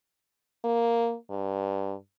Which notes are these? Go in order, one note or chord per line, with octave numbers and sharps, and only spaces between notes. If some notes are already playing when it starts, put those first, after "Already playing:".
A#3
G2